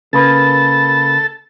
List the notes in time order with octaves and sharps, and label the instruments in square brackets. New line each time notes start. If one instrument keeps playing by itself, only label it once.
[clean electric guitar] C#3 A#3 B4 [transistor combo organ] A4 A5